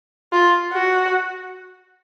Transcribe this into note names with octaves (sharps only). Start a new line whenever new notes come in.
F4
F#4